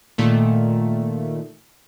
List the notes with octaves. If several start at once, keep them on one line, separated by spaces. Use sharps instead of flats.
A#2 D#3 A3